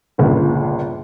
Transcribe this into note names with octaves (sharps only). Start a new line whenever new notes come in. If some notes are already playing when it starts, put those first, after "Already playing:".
G1 C#2 A#2